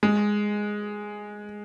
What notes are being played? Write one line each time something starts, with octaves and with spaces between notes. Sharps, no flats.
G#3